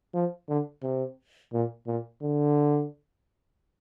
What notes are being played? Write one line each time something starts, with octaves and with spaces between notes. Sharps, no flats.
F3
D3
C3
A#2
A#2
D3